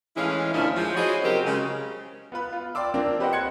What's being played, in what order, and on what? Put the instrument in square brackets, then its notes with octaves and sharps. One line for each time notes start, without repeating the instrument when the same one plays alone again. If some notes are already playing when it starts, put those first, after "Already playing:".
[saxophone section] A2 E3 G#3 C#4 E4 F5
D2 A#2 F3 C#4 D4 E4
F3 G#3
E4 F#4 G#4 C5 C#5 D#5
C#3 F#3 C4 G4 A#4
C#3 G#3
[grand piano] B3 F4 B4
F4
D5 G5 C6 D6 E6
F3 A#3 C4 D4
G4 B4 C5 D#5 F#5 G5
C6 F#6 G#6 C#7